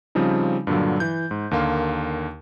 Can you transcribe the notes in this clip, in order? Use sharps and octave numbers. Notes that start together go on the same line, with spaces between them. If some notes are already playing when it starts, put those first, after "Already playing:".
C#3 F3 G3 C4 D#4
G2 A#2 D3 F#3
E3 G6
G#2
D#2 D3 A#3 F5 C6